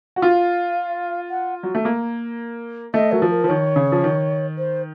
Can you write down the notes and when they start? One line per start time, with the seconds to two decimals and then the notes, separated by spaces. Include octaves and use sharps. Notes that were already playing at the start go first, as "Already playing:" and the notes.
0.16 F#4
0.22 F4 F5
1.30 F#5
1.63 F#3
1.75 A3
1.85 A#3
2.94 A3 D#5
3.12 F#3 A#4
3.22 F3
3.30 A#4
3.44 F3
3.48 D#3 C#5
3.76 C#3
3.92 F3
4.04 D#3
4.58 C5